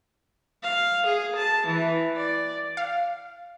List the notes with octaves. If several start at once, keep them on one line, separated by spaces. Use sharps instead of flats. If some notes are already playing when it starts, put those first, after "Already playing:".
F5
G#4
A5
E3
D5
F5